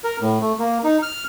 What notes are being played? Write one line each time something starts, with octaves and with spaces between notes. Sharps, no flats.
A#4
A2
A3
A#3
D#4
F6